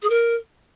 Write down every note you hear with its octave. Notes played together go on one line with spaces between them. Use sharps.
G#4
A#4